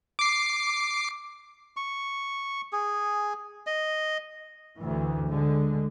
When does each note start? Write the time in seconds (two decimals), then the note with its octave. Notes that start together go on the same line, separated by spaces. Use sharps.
0.19 D6 C7
1.77 C#6
2.73 G#4
3.67 D#5
4.77 D2 E3
5.26 D3 G#3